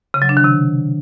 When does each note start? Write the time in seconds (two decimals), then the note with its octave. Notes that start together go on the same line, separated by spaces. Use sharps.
0.14 C#3
0.22 F#3
0.29 D4
0.37 D#3
0.44 C3